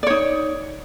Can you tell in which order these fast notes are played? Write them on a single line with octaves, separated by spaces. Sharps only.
D5 C#5 D#4